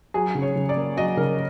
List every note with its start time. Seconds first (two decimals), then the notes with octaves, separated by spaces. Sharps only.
0.14 F#3 G#4
0.35 C#3
0.42 C#5
0.56 C#3
0.69 D5
0.77 A#3
0.97 F#3 D#5
1.17 C#3 A#4